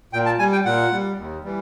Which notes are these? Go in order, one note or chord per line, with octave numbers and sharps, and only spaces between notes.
A#2 G5
A5
G3 G#5
G5
A#2 F#5
G3
D#2
E3 G3